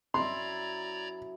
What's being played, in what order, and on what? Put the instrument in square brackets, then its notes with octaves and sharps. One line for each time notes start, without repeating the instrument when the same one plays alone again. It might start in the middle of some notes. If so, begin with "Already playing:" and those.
[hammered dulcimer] F#2 E4 [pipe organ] D5 A#5 G#6 [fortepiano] C6